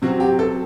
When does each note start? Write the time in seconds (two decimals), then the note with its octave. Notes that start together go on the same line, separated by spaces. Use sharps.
0.02 C3 F#3 C4 F#4
0.20 G4
0.39 A4